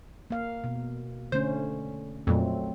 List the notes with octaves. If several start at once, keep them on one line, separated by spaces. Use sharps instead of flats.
A#3 F5
B2
D3 A3 C#4 C5
F2 A#2 F#3 A3 C4